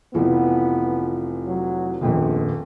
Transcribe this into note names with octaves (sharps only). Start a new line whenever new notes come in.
F1 E3 F3 B3
F#3
D#1 A#1 F2 B3